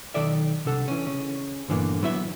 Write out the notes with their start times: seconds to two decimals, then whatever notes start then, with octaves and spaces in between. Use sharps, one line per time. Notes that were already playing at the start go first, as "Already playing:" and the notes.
0.14 B1 G2 D#3 A4 D5 E5
0.65 C2 C3 D4 A4 F#5
0.88 E3 C#4
1.07 C#3 C#4
1.68 G2 A#2 D3 E3 A#3 B3
2.02 F#3 B3 E4 D#5 E5